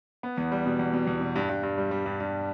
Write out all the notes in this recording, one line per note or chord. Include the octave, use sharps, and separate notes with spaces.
B3
E2
G3
B2
E2
B2
E2
B2
G2
G2
G2
G3
G3
G2
G2